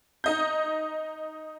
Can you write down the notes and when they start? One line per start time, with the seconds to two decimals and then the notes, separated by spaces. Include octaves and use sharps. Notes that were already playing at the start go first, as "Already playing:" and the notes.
0.24 D#4 D#5 G6